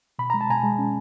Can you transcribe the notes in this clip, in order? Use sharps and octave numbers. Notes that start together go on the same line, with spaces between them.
B2 B5
G#3 A#5
A5
B2 G#5 A#5
G#3
C#4